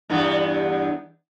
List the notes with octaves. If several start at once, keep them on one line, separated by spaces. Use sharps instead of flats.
E2 G2 B3